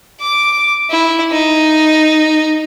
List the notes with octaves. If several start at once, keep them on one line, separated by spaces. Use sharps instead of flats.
D6
E4
D#4